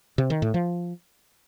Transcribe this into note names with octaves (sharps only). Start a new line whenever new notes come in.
C3
D#3
A2
F3